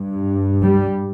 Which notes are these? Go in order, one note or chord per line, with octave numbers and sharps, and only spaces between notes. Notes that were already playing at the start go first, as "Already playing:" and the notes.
Already playing: G2
G3